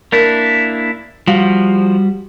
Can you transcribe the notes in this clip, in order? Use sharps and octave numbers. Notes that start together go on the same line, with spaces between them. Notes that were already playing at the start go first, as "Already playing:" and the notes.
A#3 D4 E4 A#4
F3 G3 F#4 F5